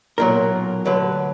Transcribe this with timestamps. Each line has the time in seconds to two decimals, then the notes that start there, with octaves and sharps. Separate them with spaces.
0.18 B1 A#2 F#3 A#4
0.85 D2 D3 F#3 B4